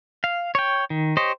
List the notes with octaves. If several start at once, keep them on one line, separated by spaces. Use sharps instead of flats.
F5
C#5 G5
D#3
G4 C5 C#5 D#5